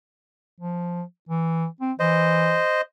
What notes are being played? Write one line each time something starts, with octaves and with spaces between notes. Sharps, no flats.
F3
E3
C4
E3 C5 D#5